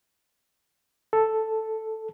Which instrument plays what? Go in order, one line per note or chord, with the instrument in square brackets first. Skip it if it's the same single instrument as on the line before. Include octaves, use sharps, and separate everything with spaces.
[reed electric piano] A4